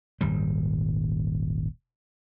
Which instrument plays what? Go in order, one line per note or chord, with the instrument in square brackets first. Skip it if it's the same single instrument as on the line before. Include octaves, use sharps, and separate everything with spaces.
[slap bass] D#1 G#1 G3